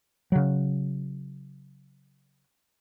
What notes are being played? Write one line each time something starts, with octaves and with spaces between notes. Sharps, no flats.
C#3 F#3